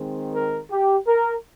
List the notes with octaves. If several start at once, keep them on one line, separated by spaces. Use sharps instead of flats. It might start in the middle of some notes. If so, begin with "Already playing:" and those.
Already playing: D#3 G#3 C4
A#4
G4
A#4